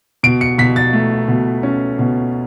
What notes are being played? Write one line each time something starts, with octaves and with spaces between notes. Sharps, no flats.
B2 D7
C#7
B2 B6
A6
A3
B2
C#4
B2